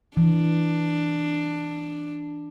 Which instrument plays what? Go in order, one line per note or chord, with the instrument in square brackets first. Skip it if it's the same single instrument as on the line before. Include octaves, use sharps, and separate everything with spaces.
[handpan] E3 [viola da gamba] D4